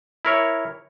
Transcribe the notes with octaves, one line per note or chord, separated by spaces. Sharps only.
E4 A#4 C#5